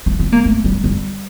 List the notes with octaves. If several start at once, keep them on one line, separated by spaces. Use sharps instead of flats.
A3
C4
A#3
A3
G3
G3